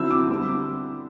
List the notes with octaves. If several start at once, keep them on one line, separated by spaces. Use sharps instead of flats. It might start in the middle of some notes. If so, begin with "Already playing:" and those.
Already playing: D3 F#3 C4 E4 E6
D6
D3 G3 C4